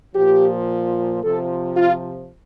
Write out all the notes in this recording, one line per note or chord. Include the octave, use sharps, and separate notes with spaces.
A#2 F3 G4
C3 F3 A4
F4